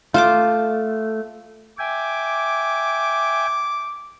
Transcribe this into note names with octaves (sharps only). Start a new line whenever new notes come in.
A3 F4 C5 D6
E5 G5 G#5 D6